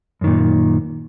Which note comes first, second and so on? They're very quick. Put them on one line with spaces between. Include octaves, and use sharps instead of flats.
F#2 D#3 A#2